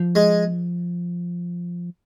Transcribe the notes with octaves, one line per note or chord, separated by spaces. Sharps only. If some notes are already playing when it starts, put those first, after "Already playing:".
Already playing: F3
G#3